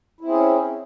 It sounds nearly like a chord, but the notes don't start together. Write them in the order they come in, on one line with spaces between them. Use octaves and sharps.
E4 C4 G#4 C#4